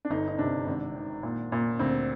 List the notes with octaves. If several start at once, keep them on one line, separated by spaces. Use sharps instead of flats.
D4
G1 D#4
D#4
C3 D4
G#1
D#3
A#2
A#2
D2 C4